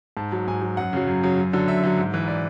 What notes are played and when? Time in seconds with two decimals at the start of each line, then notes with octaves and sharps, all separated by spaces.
0.17 G#2 A5
0.32 F#3
0.48 G#2 G#5
0.62 F#3
0.77 F#2 F#5
0.93 C#3 F#3
1.07 F#2
1.23 C#3 F#3
1.38 F#2
1.53 D3 F#3
1.67 F#2 E5
1.83 D3 F#3
1.98 G#2
2.14 E3
2.28 D5